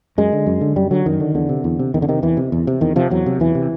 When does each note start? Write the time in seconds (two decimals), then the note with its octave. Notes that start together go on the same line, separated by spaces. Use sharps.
0.18 F#2 G#3
0.33 D3
0.46 F#2
0.61 D3
0.76 F#2 G3
0.91 D3 F#3
1.06 F#2 D#3
1.20 D3
1.34 E2 D3
1.49 C3
1.64 E2
1.79 C3
1.94 E2 D#3
2.02 D3
2.08 C3 D#3
2.22 E2 E3
2.37 C3
2.52 E2
2.67 C3
2.81 E2 D#3
2.96 C3 F3
3.10 E2 F#3
3.26 C3
3.40 E2 E3
3.55 C3